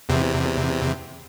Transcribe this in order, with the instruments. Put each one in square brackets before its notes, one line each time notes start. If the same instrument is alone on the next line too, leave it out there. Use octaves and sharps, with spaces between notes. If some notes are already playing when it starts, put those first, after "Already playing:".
[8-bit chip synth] E2 C3